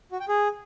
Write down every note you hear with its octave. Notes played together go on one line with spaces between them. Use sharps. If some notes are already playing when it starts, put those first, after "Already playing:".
F#4
G5
G#4